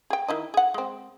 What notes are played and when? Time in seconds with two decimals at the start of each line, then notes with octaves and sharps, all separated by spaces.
0.10 G#4 G5
0.28 D#3 E4 D#5
0.54 G#4 F#5
0.74 G#3 C4